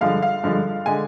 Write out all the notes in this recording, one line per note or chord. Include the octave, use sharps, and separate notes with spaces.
G2 D3 F3 G#3 F5
F5
G2 D3 F3 G#3
D3 G#3 G#5